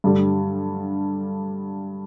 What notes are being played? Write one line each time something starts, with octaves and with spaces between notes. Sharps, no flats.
G2 D3 G3